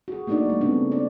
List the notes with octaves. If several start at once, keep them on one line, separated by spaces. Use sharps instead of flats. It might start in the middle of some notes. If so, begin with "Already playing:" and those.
F#4 G#4
A3 A#3 D4 D#4 F#4 D5
G3 A3
C#3 G3 B3 C4 D4
D4 D5